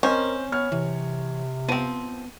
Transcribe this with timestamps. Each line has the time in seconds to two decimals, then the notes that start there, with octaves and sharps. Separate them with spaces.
0.03 C4 C#4 A#4 C5 D#5
0.52 B3 C#5 F6
0.72 C3 E3
1.69 F3 B3 C4 D#7